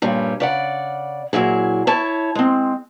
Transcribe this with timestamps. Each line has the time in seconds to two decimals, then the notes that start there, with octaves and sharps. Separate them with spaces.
0.02 G2 A#2 G3 C#4
0.40 C#3 D5 F#5
1.33 A#2 F#3 E4 G#4
1.87 E4 C#5 A5
2.35 G#3 C4